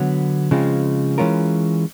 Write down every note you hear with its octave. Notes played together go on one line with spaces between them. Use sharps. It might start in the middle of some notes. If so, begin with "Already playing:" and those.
Already playing: D3 F#3 B3
C#3 F3 G#3 C4 F4
E3 G#3 C#4 F4 A#4